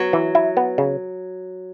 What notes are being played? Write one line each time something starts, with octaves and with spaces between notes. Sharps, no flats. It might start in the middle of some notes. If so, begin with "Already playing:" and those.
Already playing: F#3 B3
E3
E4
B3
C#3